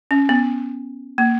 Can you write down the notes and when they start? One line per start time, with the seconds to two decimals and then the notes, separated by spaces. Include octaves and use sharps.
0.11 C#4
0.29 B3
1.18 A#3